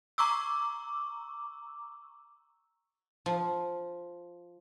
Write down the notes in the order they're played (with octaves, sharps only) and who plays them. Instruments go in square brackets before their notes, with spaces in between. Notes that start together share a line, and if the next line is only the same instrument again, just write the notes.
[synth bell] A#5 C#6 D6 E6
[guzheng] F3